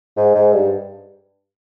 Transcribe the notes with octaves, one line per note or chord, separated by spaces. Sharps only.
G#2
G#2
G2